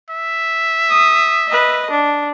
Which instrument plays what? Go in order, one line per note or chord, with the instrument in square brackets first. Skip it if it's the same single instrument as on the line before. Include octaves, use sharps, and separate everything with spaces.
[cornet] E5
[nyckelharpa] D#6
B4 D#5
D4